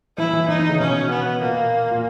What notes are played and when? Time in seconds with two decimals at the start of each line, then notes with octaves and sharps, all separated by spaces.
0.18 E3 E4
0.33 E3
0.48 E3 D#4
0.59 D#3
0.69 C#3
0.79 B2 C#4
1.10 B3
1.41 A#2 A#3
1.91 A#2